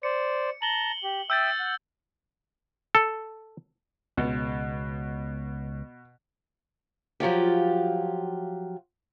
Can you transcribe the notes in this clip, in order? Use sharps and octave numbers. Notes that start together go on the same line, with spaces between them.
C5 D5 C#7
A5 A#5 F#7 G7
G4
E5 G5 D#6 E6 G6 A6
F#5
A4
C#2 B2
F3 F#3 F4 G4